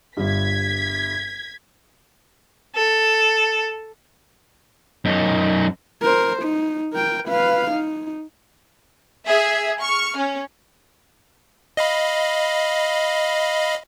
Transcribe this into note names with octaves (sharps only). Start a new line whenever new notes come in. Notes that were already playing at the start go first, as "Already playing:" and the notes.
G1 G2 G#6 B6
A4
F#2 D#4
A#4 C5
D#4
A#4 G5
B4 F5
D#4
G#4 E5
C#6 F6
C#4
D#5 F5 B5